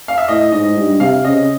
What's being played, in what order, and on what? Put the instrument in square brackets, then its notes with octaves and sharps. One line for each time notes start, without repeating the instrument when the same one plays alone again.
[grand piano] F5
E5
[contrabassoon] A2 [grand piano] D#5
[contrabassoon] G#2 [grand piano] D#5
[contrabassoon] G2
[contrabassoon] C3 [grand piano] F5
[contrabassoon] C#3 [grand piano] D#5